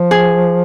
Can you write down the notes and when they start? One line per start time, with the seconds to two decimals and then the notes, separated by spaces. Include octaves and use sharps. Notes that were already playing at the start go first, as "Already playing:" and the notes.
Already playing: F3
0.11 G#4